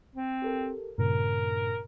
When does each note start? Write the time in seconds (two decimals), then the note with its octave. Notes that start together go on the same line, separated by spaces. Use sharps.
0.15 C4
0.42 G4 A4 A#4
0.98 G2 A#2 C#3 A#4